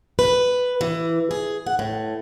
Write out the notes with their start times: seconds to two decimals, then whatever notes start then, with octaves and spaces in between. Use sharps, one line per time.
0.19 B4
0.81 E3
1.31 G#4
1.66 F#5
1.79 A2